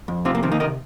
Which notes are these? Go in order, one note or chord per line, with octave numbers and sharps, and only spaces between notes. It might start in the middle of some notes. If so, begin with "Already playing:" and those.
F2
C3 C4 F4
A#3
D#3 C4
A#3 D#4
C3 A#4 D#5